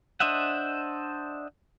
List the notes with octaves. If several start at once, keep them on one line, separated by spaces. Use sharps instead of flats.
D4 C5 D#5 E5 F#5